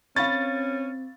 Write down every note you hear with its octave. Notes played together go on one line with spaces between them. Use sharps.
C4 C#4 F5 B5 C#6 A6